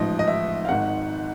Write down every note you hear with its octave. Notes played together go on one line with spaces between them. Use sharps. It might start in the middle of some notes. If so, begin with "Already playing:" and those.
Already playing: A1 G#2 F3 D#5
D#5
E5
F5
G#1 G#2 D#3 F#5